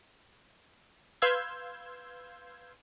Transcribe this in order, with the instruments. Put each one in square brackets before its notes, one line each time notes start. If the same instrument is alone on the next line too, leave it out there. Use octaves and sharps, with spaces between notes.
[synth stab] B4 F5 C6 E6 G6 G#6